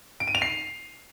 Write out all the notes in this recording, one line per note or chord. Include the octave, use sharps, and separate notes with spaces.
D7
D#7
F7
C7